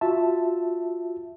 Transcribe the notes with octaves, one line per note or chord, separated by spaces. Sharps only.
F4 F#4 E5 A5